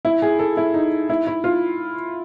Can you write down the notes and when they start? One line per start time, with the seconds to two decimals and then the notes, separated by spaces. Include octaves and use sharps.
0.05 E4
0.22 G#4
0.39 A4
0.57 E4
0.74 D#4
1.10 E4
1.27 E4
1.44 F4